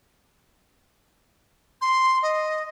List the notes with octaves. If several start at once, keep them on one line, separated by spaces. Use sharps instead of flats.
C6
D#5